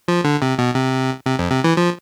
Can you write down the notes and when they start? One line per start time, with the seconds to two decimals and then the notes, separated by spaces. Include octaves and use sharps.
0.08 F3
0.24 D3
0.42 C3
0.58 B2
0.75 C3
1.26 C3
1.39 F2
1.51 C3
1.64 E3
1.77 F3